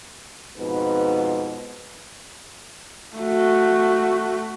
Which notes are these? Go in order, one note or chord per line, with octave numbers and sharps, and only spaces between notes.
F2 G#2 B2 B4
A3 F#4